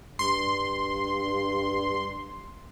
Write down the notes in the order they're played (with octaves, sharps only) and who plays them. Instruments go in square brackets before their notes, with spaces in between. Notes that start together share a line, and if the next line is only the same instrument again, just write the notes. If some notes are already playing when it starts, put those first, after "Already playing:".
[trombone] G2 [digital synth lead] C6